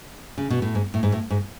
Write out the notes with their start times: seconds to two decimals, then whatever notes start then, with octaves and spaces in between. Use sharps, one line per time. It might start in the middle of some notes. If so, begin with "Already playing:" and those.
0.38 C#3
0.50 B2
0.62 A2
0.75 G#2
0.94 A2
1.03 G#2
1.12 A2
1.30 G#2